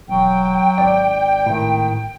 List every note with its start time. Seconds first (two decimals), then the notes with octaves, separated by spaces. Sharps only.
0.08 E1 F#3 G5
0.78 G#1 D5
1.46 A2 D#3